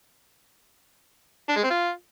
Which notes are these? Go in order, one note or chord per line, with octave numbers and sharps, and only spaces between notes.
D4
G#3
C4
F4